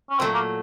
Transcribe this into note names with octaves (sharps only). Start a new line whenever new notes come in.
C#4
A#2 F#3 A3 C4
A#3